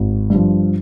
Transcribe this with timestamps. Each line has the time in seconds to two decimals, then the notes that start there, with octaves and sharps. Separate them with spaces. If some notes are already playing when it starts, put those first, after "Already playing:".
Already playing: G#1
0.30 G2 F3